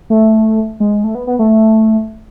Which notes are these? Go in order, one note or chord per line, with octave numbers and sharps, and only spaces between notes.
A3
G#3
A3
B3
B3
A3